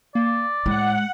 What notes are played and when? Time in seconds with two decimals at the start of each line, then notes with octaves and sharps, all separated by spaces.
0.15 A#3 D5
0.66 A2 G#3 F#5